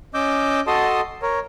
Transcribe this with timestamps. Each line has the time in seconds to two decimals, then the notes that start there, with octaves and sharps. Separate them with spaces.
0.14 C#4 D#5 D6 E6 G6
0.67 F#4 A4 D#5 A5 C6 D#6
1.22 A#4 C#5